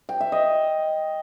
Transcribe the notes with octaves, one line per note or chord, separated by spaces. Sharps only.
G5
E5
D#5